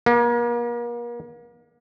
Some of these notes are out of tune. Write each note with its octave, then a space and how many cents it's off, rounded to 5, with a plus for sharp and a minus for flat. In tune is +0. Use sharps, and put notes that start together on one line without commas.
A#3 +40